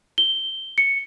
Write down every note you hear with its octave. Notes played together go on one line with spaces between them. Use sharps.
G7
C#7